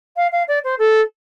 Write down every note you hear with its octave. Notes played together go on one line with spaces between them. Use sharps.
F5
F5
D5
C5
A4